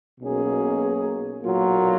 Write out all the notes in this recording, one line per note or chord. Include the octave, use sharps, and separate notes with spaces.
B1 B2 A#3 C#4 G#4
B1 A#2 F#3 A#3 F4